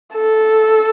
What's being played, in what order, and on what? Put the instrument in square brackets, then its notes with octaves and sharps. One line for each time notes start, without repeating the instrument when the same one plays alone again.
[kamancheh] A4